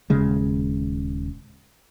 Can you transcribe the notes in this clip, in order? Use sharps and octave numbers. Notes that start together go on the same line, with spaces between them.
D#1 C#3 G#3